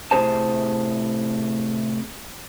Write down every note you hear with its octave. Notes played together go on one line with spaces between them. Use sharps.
A2 C3 F3 G#4 C5 A5